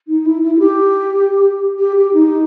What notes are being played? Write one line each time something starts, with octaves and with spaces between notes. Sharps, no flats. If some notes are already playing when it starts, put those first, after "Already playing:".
D#4
E4
E4
E4
G4
G4
G4
D#4